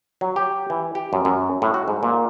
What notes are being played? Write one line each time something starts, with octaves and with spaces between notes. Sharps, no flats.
F#3
G4
E3
G4
F#2
F#2
A2
F#4
G#2
A#2